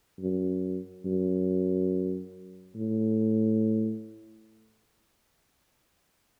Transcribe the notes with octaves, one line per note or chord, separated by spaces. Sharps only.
F#2
F#2
A2